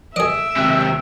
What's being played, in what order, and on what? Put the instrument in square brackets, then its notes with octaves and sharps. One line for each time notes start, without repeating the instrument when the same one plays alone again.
[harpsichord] G#4 D#5 [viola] E5 [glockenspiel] D7
[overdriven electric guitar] D#2 C3 [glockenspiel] E6 F#6